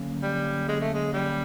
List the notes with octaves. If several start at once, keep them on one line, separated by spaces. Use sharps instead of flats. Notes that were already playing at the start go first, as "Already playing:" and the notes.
Already playing: D3 F#3 A#3 C#4
G3
G#3
A3
G#3
G3